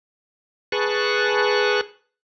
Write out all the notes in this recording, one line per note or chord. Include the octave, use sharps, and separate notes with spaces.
G#4 B4 A5 C#6 F#6